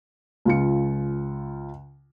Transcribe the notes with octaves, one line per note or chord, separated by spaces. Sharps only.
C#2 F4 C#7